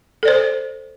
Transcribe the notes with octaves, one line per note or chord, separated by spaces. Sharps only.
A4 C5 D5